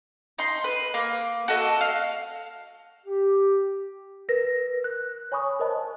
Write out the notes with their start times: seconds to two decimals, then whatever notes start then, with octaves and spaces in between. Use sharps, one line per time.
0.38 D#4 C6
0.64 B4
0.94 A#3
1.48 F#4 A4 D#5
1.81 F5
3.06 G4
4.29 A#4 B4 A#6
4.84 F#6
5.32 C#5 G#5 B5 C#6 D#6
5.59 A#4 C5 D#5 A5